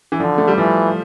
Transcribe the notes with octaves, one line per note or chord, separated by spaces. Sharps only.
E3
D3 F3
A3
G3
E3 F3